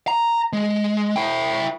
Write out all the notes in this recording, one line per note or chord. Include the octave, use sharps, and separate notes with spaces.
A#5
G#3
E4 G5